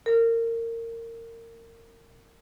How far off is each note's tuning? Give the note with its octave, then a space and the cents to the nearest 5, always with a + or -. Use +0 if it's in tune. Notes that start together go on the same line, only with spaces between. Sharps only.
A#4 -25